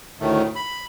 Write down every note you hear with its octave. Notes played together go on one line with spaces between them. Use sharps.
D2 A2 D#3 A3
B5